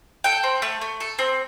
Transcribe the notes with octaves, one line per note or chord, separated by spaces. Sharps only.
A4 G5
C4
A3
A3
A4
C4